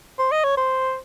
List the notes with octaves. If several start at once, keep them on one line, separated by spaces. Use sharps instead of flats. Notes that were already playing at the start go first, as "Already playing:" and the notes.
C5
D#5
C#5
C5